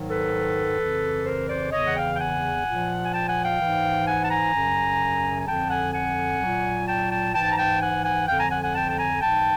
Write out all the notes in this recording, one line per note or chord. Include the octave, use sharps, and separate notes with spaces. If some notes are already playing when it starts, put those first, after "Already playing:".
Already playing: G#2 D#3 F#3
A4 B4
F2 C#3 E3
A#4 C5
C5 D5
E2 C#3 E3 C#5 D#5
F#5
F5 G5
G5
F#5 G#5
A#2 F3
G#5
G5 A5
F#5 G#5
F5 G5
G#2 E3
F#5 G#5
A5
G#5 A#5
F#2 C#3 F#3
G#5
F2 D3 F3 G5 A5
F#5 G#5
F#5 G#5
A#2 F#3
G5 A5
G5 A5
G#2 E3 G5 A5
A#5
G5 A5
F#5 G#5
F#5 G#5
F2 D3 F3 F5 G5
G#5 A#5
F#5 G#5
F#5 G#5
G5 A5
A5
G#5 A#5
G#2 E3 G5 A5